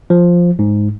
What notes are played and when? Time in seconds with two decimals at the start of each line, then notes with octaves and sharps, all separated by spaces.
0.10 F3
0.59 G#2